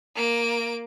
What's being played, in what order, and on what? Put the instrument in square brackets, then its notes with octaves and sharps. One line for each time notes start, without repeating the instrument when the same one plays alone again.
[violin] A#3 D7